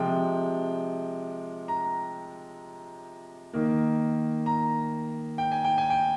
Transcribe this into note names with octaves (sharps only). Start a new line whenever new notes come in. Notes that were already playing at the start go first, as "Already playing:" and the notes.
Already playing: C3 F3 G#3 G5
A#5
D#3 A#3
A#5
G5
G#5
G5
G#5
G5